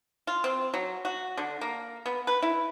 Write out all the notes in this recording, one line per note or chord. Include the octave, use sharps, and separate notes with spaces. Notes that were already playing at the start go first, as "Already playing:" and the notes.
F4
C4
F#3
F#4
D3
A#3
B3
B4
E4